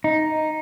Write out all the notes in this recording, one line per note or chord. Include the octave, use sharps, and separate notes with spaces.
D#4